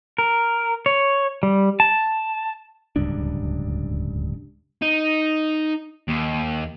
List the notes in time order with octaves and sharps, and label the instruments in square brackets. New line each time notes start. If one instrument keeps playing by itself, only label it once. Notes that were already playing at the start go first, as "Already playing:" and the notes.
[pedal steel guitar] A#4
C#5
G3
A5
[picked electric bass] D1 C#2 G2 D4
[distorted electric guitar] D#4
D#2